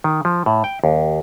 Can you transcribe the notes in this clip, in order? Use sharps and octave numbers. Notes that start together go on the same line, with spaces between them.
D#3
F3
A2
G5
D#2